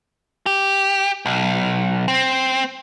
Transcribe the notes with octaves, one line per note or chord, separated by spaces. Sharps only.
G4
B1
C4